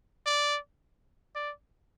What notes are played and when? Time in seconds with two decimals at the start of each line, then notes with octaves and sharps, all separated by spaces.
0.26 D5
1.35 D5